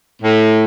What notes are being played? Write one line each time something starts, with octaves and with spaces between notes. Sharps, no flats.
A2